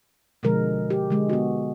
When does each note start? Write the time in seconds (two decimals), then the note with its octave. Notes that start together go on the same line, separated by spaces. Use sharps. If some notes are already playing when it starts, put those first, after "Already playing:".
0.43 B2 D3 F3 G#3 A#4
0.90 G4
1.10 D3 G#3
1.29 B3 F#4